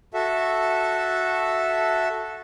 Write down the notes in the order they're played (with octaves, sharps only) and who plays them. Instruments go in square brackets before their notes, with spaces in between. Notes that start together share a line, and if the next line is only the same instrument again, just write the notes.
[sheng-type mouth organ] F#4 A4 E5